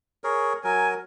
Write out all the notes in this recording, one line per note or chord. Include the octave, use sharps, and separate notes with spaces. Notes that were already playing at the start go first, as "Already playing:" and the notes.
G#4 A#4 C#5
F#3 A#4 G#5